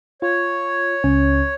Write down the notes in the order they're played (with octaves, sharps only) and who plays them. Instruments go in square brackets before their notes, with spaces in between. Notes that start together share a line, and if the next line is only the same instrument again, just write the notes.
[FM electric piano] F4 [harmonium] C#5
[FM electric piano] C#2 C#4